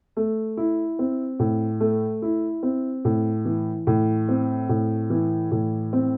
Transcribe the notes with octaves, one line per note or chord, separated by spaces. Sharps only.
A3
E4
C4
A2
A3
E4
C4
A2
E3
A2
C4
A2
E3
A2
C4